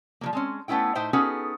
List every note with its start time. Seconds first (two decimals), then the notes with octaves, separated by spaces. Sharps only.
0.21 F3 F#3 A#3
0.33 G#3 C4 C#4
0.68 A3 B3 C#4 E4 G5
0.95 A2 D#4 C5 E5 G5
1.13 B3 C#4 D#4 F#4 G#4 A4